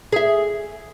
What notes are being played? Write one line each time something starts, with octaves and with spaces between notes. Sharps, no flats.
G#4 E5